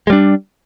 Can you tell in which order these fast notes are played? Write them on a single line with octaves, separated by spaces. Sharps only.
G#3 G3 D4